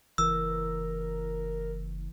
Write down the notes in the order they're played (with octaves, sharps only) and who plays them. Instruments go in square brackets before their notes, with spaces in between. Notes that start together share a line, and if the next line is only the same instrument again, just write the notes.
[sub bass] F#1 [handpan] E3 [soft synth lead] A#4 [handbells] E6